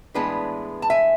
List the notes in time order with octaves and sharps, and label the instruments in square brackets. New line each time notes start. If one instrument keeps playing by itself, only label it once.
[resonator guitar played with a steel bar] A2 E3 G#3 B3 D4 G#4 B4
A5
E5 G#5